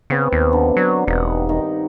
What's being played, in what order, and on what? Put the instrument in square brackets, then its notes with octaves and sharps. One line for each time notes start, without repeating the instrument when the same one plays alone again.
[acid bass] C#3 [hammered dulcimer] B3 C4
[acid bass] D#2
[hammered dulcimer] D3 F#3
[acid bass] F#3 [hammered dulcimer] D5 C6
[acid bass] E1 [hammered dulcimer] G2 D#4 F#5
[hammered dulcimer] D#3